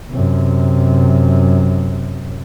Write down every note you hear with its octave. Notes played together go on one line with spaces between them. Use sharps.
F#2 C3